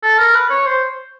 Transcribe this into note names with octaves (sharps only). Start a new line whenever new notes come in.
A4
A#4
B4
C#5
C5